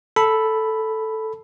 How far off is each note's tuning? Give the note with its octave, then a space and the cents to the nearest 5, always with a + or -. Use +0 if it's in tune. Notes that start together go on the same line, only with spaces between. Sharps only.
A4 +0 B5 +0